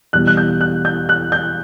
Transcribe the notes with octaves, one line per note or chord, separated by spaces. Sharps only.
E2 B2 G3 F#6
F#6
G6
F#6
G6
F#6
G6